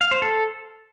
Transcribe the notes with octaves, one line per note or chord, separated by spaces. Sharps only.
F5
C5
A4